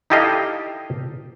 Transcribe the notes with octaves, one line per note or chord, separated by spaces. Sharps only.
D#4 E4 G4 A4 D#5 F5